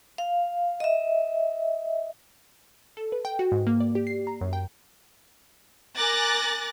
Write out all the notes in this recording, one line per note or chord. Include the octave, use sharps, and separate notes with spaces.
F5
D#5 E5
A4
B4
G5
F#4
G#2
A#3
D5
G4
C7
A#5
F#2
G5
A#4 G#5 D6 F#6 A6 A#6